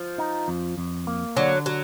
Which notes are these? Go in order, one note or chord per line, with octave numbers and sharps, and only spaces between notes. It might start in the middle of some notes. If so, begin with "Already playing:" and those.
Already playing: F3
D#4
F2
F2
A#3
D3 F#3
F#3